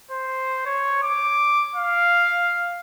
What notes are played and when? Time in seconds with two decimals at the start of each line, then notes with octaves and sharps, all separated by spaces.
0.11 C5
0.66 C#5
1.02 D6
1.75 F5